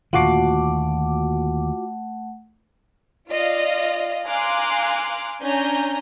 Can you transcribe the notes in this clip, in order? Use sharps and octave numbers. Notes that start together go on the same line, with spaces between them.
D#2 A#2 D3 A3 F4 F#4 F#5 D6
F4 D5 D#5 F5
F5 G#5 A#5 C6 D6 F#6
C#4 D4 G#5 A#5 G6